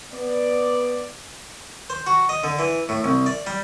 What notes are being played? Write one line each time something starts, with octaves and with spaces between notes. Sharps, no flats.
B3 D5
C5
F#4
D#5
D3
E3
A2
C2
D5
G3